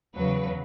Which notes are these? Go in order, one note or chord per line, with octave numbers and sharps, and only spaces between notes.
E2 C#3 F#3 B4